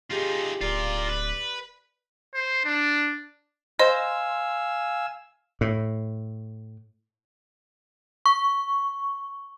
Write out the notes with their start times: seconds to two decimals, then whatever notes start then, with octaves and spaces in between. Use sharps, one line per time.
0.11 D#4 F4 G4 G#4
0.61 D1 F4 A#4 D5
1.09 B4
2.35 C5
2.65 D4
3.79 C5 D#5 F5 G#5 E6
5.61 A2
8.26 C#6